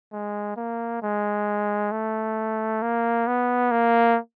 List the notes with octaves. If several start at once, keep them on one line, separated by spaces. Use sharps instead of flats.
G#3
A#3
G#3
A3
A#3
B3
A#3